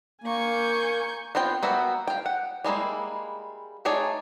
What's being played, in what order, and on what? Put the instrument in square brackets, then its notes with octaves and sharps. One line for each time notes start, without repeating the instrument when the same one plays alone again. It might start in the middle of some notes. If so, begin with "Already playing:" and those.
[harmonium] A#3 [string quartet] G#5 C#6 G6
[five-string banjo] B3 C4 F4 G5
A#3 B3 F#4 E5 G5
F5 G5
F#5
G3 G#3 A#3 E4
A3 D#4 G#4 C#5 D5